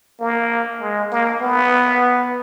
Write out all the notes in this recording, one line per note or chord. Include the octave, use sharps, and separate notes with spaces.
A#3
G#3
A#3
B3